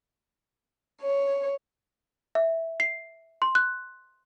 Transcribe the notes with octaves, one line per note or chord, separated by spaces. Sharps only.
C#5
E5
C7
C6
F#6